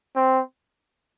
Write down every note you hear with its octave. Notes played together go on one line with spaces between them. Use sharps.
C4